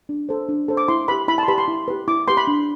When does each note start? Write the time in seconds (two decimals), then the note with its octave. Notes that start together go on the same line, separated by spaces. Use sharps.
0.09 D4
0.29 A4 C5
0.49 D4
0.68 A4 C5
0.77 D6
0.88 E4 C6
1.08 G4 B4 B5
1.28 E4 B5
1.38 A5 C6
1.48 G4 B4 B5
1.58 C6
1.68 E4
1.88 G4 B4
2.08 E4 D6
2.28 G4 B4 C6
2.37 B5
2.47 D4